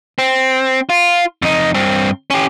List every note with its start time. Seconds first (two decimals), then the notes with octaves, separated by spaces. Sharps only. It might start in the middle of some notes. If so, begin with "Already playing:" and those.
0.19 C4
0.89 F4
1.42 F2 D#4
1.75 G2 C4
2.30 C#4 G4